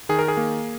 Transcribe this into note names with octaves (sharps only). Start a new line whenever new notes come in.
D#3 G#4
A#4
G#4
A#3